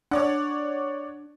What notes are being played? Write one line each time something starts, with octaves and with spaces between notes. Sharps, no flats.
D4 C#5 D5 F#5